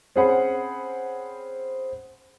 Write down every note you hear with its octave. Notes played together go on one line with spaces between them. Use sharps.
C4 C#4 G#4 C5 F#5 B5